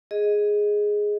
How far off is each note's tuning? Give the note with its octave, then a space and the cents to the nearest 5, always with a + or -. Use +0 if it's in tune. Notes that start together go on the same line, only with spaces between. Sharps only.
G#4 +0 D#5 +0